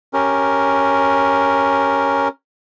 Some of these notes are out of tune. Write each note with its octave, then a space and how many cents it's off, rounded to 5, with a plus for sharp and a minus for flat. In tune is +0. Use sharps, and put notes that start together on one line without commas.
C#4 +0 G4 +0 A#4 +0